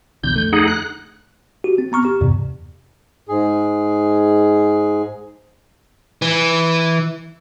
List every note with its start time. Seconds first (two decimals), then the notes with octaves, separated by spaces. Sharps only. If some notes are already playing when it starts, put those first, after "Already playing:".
0.23 B1 E2 D3 G6
0.35 F2 D3 A3
0.53 D#4 G#4 F#5
0.68 F#6
1.64 F#4 G4
1.78 C4
1.92 B3 A#5 C#6 F6
2.05 G4
2.21 E2 G2 C3
3.29 G#2 G#4
6.22 E3